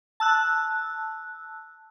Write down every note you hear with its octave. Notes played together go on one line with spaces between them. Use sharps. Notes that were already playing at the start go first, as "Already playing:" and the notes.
A5 E6 F#6